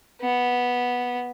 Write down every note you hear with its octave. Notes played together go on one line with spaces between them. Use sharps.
B3